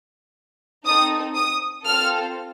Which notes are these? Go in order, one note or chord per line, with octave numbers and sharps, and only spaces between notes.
C4 D#4 A4 D#6
D#6
C4 F4 A4 F6